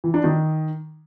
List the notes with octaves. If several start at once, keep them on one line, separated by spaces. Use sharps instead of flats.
E3
D4
D#3